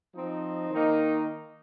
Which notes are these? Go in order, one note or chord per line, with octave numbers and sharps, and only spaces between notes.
F3 C4 D#4
D#3 A#3 D#4